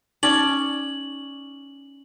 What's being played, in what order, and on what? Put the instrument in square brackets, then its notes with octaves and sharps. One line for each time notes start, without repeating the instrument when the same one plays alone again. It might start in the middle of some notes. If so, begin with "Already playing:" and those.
[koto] C#4 D5 [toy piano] D#4 [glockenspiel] F#7